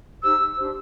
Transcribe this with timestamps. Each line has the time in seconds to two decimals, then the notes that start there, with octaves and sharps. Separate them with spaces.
0.23 D#4 G4 C5 E6
0.57 D4 G4 C5